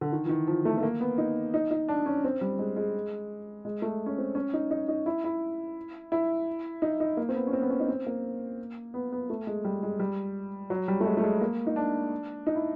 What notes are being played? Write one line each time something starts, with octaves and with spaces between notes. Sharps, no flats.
D3
D#3
E3
D#3
F3
A3
A3
A#3
B3
D#4
D#4
D#4
D4
C#4
C4
G3
G#3
G#3
G#3
A3
C#4
C4
C#4
D#4
D#4
D#4
E4
E4
E4
D#4
D#4
A#3
C4
B3
C#4
C4
B3
C#4
D#4
C4
A#3
B3
B3
A3
G#3
G3
G#3
G3
F#3
G3
A3
G#3
A3
G#3
A#3
D#4
D4
D#4
E4